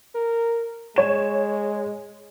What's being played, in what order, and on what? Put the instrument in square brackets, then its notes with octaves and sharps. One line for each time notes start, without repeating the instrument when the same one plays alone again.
[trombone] A#4
[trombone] G#3 [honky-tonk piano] C#5 E7